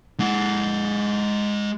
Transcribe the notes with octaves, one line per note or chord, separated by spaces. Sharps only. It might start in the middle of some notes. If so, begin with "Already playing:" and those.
G#3 F#5